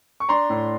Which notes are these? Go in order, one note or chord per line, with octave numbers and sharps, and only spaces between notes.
C#6
D4 A#5 C6
A2